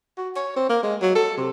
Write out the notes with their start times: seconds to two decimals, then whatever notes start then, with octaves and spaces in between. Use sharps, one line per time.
0.18 F#4
0.36 C#5
0.56 C4
0.69 A#3
0.83 G#3
1.02 F#3
1.15 A4
1.38 C3